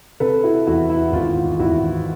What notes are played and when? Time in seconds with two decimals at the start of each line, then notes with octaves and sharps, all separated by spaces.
0.20 C3 A4 B4
0.43 E4 F#4
0.66 E2 E4 F#4
0.90 E4
1.13 G#1 F4
1.59 G#1 E4 F#4